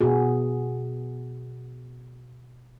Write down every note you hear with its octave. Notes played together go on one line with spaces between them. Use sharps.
B2 B3 F#4 G#4